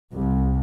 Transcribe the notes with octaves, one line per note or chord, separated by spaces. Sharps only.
C2